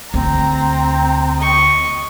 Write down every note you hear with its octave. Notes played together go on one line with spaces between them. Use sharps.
D2 C4 A#5
D#5 C#6